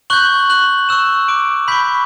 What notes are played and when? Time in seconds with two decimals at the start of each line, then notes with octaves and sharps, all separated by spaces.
0.10 C#6 F#6 G6 F#7
0.50 F#6 F#7
0.89 C#6 E6 F#6 E7
1.28 D6 D7
1.68 B5 C#6 G6 B6